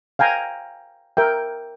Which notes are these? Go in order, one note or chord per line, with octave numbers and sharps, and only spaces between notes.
F5 G5 G#5 A#5
A#4 E5 G5